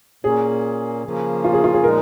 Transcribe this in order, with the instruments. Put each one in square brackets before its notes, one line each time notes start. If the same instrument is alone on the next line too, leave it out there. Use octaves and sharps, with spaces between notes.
[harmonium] A#2 A#3 C#4 [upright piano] G#4
[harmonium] C#3 F3 A#3 C#4
[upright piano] F4
G#4
F4
G#4
[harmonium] A#2 F3 G#3 D#4 [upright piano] A#4